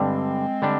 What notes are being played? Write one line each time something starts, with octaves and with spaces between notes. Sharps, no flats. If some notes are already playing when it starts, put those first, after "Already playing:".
Already playing: G2 D3 G3 G#3 C4 D4
D3 G3 D4